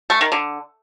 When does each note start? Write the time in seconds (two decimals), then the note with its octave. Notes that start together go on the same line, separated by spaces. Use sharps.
0.10 A3
0.21 D#3
0.32 D3